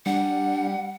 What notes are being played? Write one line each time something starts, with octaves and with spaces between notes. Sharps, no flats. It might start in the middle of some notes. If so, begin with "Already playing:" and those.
G3 D4 F#5